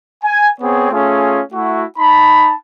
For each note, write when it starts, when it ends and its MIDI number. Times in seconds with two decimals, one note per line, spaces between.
0.24 0.49 80
0.61 0.89 59
0.61 0.89 60
0.61 0.89 68
0.61 0.89 73
0.91 1.41 57
0.91 1.41 61
0.91 1.41 65
0.91 1.41 68
1.52 1.84 57
1.52 1.84 64
1.52 1.84 66
1.98 2.52 63
1.98 2.52 81
1.98 2.52 83